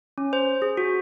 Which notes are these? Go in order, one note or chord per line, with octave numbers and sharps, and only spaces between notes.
C#4
C5
G#4
F#4